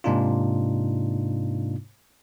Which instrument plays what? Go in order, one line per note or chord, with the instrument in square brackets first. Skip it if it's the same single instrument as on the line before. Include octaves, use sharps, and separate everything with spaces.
[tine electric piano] G#2 C3 A#3 D4 D#4 F4